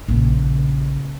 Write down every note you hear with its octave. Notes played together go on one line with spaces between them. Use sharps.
A#1 C#3